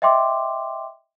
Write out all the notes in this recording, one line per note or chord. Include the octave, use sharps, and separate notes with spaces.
D#5 E5 G5 C6 D6